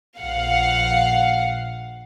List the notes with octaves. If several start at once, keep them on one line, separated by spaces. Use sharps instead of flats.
A#1 F5 F#5